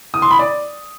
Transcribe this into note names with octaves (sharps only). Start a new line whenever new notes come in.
D#6
C6
B5
D5